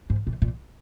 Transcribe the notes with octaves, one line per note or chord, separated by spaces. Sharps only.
G#2
A#2
A#2